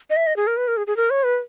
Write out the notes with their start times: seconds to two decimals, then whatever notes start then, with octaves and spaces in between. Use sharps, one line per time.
0.10 D#5
0.16 E5
0.27 D#5
0.37 G#4
0.47 A#4
0.57 B4
0.68 A#4
0.77 G#4
0.87 G#4
0.97 A#4
1.10 C#5
1.24 B4